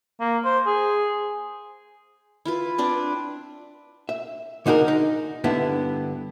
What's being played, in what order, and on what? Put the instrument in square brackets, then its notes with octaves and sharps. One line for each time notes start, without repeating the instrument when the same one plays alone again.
[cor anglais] A#3
C5
G#4
[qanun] E4 F4 B4
C4 D4 B4
[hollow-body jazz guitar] E5
D3 D#4 F#4 G#4 A#4
D#4
G2 D3 B3 E4